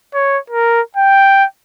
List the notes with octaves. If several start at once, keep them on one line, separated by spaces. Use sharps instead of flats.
C#5
A#4
G5